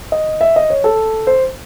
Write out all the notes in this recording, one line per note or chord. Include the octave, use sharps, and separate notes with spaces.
D#5
E5
D#5
C#5
A4
C5